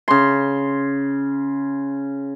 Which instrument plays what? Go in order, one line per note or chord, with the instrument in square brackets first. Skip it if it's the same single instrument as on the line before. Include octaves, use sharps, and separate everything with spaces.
[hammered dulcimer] C#3 C6